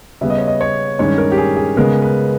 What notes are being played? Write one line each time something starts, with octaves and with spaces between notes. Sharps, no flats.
C#3 G3 B3 E5
D#5
C#5
D#5
C#5
G2 D#3 G#3 C#4 C#5
A#4
G4
G#4
G#4
C#3 G#3 B3 A#4
B4